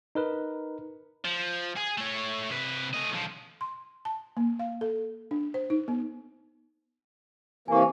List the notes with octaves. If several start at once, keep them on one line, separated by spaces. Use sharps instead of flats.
D#4 A#4 B4
F3
G#4
A3 C#5
C3 B4
A3 D#5
B1 F3
C6
A5
A#3
F5
A4
D4
C5
D#4
B3
C3 E3 A#3 G#5 C#6